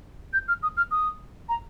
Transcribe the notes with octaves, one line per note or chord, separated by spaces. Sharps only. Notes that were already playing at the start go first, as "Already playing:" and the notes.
G6
F6
D#6
F6
D#6
A#5